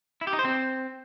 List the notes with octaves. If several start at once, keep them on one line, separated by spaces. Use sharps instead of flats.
E4
G4
D#4
C5
C4